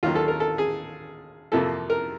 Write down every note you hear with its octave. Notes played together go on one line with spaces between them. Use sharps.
D#2 D#3 F#3 A#3 F4
A4
A#4
A4
G#4
F2 C3 F3 A#3 A4
A#4